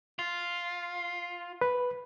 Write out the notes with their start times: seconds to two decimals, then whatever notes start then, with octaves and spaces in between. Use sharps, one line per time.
0.19 F4
1.61 B4